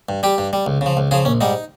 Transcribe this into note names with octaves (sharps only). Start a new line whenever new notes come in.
G2
G3 G4
G2
G3
C#2
C#3
F3
C#2
C#3 F3 G#4
A#1 C#4
G#2 G3 D#4